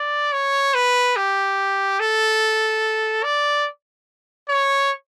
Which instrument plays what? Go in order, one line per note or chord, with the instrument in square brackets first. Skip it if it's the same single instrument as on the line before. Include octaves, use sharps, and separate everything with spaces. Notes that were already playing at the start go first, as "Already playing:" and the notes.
Already playing: [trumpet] D5
C#5
B4
G4
A4
D5
C#5